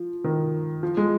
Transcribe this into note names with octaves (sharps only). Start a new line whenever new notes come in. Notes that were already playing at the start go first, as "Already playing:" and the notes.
Already playing: F3
D#3
F3
G#3